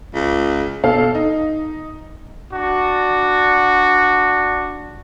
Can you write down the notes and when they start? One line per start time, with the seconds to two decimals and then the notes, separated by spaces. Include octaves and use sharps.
0.14 C#2
0.84 B2 A4 F5
1.15 D#4
2.53 D4 F#4